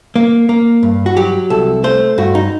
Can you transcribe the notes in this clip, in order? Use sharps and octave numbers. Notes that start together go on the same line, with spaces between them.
A#3
A#3
G2
F#4
F#3 G4
C2 A4
A3 C5
G2 F#4
D#4